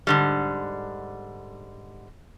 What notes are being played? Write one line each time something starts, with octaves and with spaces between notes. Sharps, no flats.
G#2 D3 G3